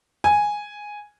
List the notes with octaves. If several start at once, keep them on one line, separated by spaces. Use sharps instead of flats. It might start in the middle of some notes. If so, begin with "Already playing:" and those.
G#5